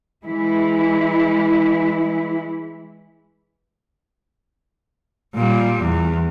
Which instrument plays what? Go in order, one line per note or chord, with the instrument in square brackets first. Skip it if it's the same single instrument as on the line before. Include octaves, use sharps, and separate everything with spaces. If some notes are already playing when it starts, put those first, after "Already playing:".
[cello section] E3 G#3 E4
[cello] A#2 G3
E2